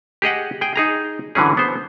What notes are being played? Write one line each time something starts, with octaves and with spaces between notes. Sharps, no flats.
G4 G#4 D#5 F#5
G#4 G5
D#4 G#4 A#5
D3 E3 F#3 C#4 G#4
B3 C5